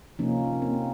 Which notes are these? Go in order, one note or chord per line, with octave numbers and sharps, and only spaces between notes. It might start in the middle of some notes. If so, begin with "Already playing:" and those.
C3 F3 A#3 C#4 D#4
A#3 C4